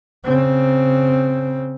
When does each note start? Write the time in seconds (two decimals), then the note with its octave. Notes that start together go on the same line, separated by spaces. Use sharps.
0.24 C#3 C4